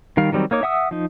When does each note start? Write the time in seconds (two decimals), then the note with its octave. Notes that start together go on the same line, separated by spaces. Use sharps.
0.17 D#3 G3 F5
0.32 D#3 F#3 G3 C4
0.51 A#3 D#4 C#5 D6
0.63 E5 F#5 D#6 E6
0.91 F3 D#4